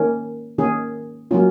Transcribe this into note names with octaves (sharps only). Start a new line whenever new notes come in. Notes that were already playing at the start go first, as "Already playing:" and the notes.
Already playing: D#3 A#3 C#4 A#4
D#3 A#3 C#4 G#4
F#3 A#3 C#4 F4